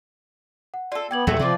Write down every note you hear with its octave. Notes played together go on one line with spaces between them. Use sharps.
F#5
F4 A4 D5
B3 D5 G5 G#6 F#7
E2 A#2 E3 G3 A3 F#4 A4
C3 F3 C4 F4 B4 D5